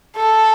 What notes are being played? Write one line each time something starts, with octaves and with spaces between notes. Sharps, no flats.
A4